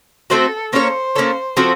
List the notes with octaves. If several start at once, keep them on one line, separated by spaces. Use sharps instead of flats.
A3 C4 F#4 A4 C5
A#3 C#4 A4 C5 C#5
A#3 C#4 A4 C#5
F3 C4 F#4 A4